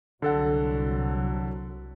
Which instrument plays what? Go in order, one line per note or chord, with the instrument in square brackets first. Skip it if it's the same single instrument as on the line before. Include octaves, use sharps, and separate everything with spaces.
[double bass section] C2 F#3 [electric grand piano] D3 A4 F#5